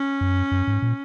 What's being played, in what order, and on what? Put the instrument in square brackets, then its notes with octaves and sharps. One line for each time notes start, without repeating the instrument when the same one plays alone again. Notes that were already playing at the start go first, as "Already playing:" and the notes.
Already playing: [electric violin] C#4
[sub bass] F#2
F#2
G#2
A#2